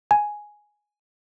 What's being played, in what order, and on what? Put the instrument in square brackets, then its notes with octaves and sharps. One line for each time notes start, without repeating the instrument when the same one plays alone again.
[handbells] G#5